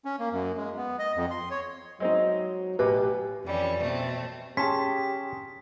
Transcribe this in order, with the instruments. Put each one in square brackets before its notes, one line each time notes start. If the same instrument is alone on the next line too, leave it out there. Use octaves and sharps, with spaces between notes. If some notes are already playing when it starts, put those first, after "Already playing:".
[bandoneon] C#4
A#3
F#2
G#3
B3
D#5
F2
C6
C#5
[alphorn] F#3 [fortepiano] G#3 C4 D#4
[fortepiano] A1 B2 D6 [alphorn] G4 [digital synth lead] B4
[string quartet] F2 E3 G3 C#4
B2 A3 C4
[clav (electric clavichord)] C#4 [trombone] G4 [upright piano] G#4 A5 C6 [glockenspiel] B6